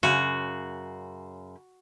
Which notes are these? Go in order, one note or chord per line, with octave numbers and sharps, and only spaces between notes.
F#2 C#3 F#4